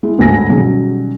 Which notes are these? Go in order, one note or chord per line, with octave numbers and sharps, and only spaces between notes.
G#3 E4
G1 D2 G#2 A4 G#5 A#6
B2 D#3 F#3 G3 C#4 G#4